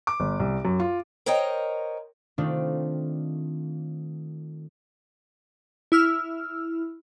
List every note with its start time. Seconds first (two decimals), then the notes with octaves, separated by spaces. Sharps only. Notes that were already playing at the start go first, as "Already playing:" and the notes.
0.07 D6
0.20 G1
0.40 C2
0.65 F#2
0.80 F4
1.26 A#4 C5 C#5 D#5 G5 A#5
2.38 D#3 A3 C4 D4 D#4 F4
5.92 E4 E6 F6